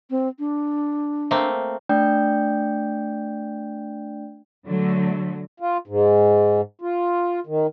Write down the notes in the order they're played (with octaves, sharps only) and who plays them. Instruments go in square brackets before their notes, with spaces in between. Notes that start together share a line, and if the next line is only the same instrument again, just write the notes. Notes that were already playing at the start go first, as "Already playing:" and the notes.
[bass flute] C4
D4
[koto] A3 A#3 C4
[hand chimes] A3 D4 D5 G5 G6
[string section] D3 F#3 A3
[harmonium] F4
G#2
F4
D#3